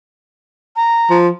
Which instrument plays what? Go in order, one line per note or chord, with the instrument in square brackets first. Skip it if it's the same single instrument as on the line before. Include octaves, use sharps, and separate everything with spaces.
[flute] A#5
[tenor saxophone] F3